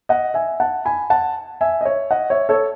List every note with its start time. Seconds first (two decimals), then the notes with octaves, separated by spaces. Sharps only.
0.09 D#5 F#5
0.34 E5 G#5
0.60 F#5 A5
0.85 G#5 B5
1.10 F#5 A5
1.61 E5 G#5
1.81 D#5
1.85 C#5 E5
2.11 D#5 F#5
2.30 C#5 E5
2.49 A4 C#5